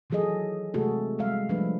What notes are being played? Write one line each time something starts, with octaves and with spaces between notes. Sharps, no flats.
D#3 E3 F#3 G#4 A4 D#5
C3 G#3 A3 F#4 G#4 A4
G3 G#3 E5 F5
F3 G3 A3 D4 B4